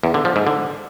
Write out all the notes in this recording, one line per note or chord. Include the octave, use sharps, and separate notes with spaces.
E2
D3
F3
G#2
D3